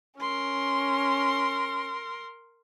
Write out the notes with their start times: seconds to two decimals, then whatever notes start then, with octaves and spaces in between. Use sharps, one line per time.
0.20 C#4 A#4 C6